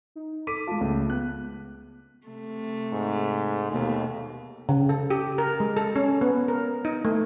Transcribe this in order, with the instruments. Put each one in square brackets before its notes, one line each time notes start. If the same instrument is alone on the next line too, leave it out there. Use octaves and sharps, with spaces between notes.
[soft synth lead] D#4
[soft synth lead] A4 [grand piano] D6 B6 D#7
[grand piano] G#3 F4 [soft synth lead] A5
[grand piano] C#2 [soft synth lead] A3
[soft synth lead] B3 [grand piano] F#6
[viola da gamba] C3 A3
[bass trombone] G#2
[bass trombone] D#2 [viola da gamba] B2 D#3 A3
[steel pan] C#3
A4
G4
A#4
G#3
A4
C#4
B3
A#4
D#4
A3